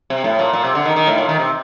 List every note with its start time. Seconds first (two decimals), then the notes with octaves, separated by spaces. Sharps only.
0.10 C3
0.24 A2
0.39 A#2
0.53 A#2
0.64 C3
0.75 D3
0.85 D#3
0.96 D#3
1.07 A2
1.18 A#2
1.29 D#3
1.39 C3